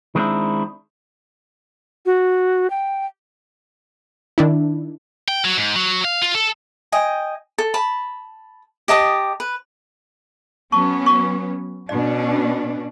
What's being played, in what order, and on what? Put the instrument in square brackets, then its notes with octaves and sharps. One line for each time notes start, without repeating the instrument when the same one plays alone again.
[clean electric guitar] D#3 G#3 B3 C4 D4 E4
[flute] F#4
G5
[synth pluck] D#3 D4 E4
[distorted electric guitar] G5
F#3
G#2
F#3
F5
F4
A4
[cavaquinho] D#5 G5 G#5
A4
A5 B5
G4 D#5 A5 D#6
B4
[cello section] F#3 B3 C#4 [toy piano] A5 C#6
[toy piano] C#6
[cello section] B2 C#4 D4 [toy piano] D5